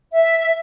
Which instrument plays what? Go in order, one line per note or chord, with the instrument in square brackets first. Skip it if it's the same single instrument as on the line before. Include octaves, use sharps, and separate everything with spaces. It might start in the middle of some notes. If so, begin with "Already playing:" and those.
[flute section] E5